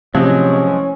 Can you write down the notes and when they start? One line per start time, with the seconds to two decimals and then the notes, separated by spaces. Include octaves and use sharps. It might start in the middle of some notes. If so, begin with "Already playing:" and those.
0.15 A1 C3 F3 F#3 G#3 C#4